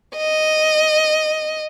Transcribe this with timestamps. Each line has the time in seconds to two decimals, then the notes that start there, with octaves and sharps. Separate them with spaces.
0.17 D#5